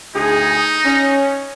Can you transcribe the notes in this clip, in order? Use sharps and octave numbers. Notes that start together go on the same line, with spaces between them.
D2 D#4 G#4
C#4